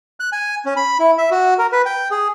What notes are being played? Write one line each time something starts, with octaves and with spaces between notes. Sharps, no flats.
F#6
G#5
C#4
B5
E4
E5
F#4
A#4
B4
G5
G#4